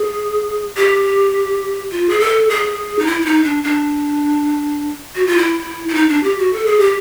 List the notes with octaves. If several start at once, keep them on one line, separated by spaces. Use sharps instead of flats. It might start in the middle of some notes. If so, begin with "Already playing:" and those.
Already playing: G#4
G4
F4
G#4
A4
G#4
D#4
E4
E4
D#4
D4
D4
F#4
F4
E4
E4
D#4
D4
G4
F#4
A4
G#4
G4